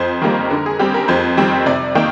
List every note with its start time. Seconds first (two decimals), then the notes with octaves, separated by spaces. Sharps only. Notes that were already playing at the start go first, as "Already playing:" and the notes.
Already playing: F2 C5
0.22 D#3 G3 A#3 A#4
0.50 D3 A#4
0.66 G#4
0.79 G3 C4 G4
0.94 A#4
1.08 F2 C5
1.37 D#3 G3 C4
1.66 C3 D5
1.95 D#3 A#3 G5